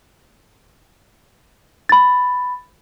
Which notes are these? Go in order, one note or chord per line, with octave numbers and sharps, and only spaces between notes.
B5 A6